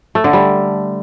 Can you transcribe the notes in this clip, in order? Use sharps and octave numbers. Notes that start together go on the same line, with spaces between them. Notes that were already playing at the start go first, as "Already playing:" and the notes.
A3
D3
G3